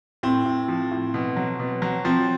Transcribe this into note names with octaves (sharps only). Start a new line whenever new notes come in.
A2 C4
A2
F3
A2
B2
F#3
B2
F#3
F3 C4